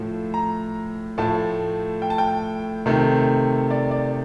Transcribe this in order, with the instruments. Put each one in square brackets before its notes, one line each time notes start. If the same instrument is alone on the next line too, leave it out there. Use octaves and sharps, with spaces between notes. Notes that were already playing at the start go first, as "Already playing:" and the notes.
Already playing: [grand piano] A2 F3 A3
A#5
A2 F3 A3 A5
G5
A5
G5
C3 D#3 A3
D5
D5